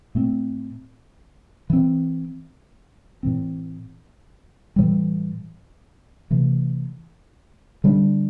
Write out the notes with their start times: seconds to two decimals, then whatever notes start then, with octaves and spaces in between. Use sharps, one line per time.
0.15 A2 A3 C4
1.70 E3 C4
3.23 A2 E3 C4
4.76 A2 E3 G3
6.30 C3 E3 A3
7.84 D3 G3 D4